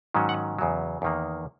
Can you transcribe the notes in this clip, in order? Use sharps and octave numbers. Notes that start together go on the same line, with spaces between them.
G#2 D#3 F#3 C#4
F#5
E2 C#3 F#3
E2 D#3 A#3